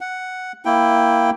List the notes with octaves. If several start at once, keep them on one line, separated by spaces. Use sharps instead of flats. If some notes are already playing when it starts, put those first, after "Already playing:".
F#5
A#3 E4 G5